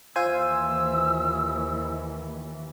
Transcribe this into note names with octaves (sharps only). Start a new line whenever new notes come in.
D#2 E3 F4 C5 G#5 E6